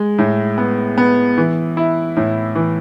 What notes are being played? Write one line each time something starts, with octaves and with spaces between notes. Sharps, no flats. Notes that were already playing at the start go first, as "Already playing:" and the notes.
Already playing: G#3
A2
B3
B3
E3
E4
A2
E3